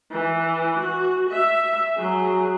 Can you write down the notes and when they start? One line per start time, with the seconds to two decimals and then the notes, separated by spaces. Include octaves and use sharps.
0.11 E3
0.80 F#4
1.30 E5
1.96 F#3 G#4